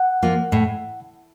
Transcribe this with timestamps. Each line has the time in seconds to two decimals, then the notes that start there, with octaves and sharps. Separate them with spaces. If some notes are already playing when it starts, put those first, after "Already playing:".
Already playing: F#5
0.23 F3 A#3 F4
0.52 A2